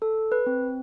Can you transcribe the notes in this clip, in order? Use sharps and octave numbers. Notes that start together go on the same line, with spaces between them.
A4
B4
C4